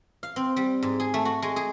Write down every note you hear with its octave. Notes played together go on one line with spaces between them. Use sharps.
F5
C4
G3
G#2
G#4
A3
F#4
G#3
G#4